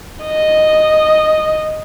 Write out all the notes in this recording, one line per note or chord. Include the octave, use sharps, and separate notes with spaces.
D#5